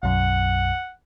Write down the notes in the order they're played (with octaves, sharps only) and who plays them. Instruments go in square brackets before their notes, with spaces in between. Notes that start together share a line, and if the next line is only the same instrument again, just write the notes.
[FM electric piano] B1 F#2 [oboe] F#5